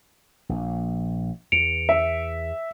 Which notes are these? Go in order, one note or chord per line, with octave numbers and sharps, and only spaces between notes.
A#1
E2 C#7 D7 F7
E5